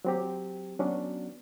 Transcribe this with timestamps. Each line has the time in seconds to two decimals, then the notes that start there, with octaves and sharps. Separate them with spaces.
0.05 F#3 C4 G4
0.79 F#3 B3 C#4 D4 F#4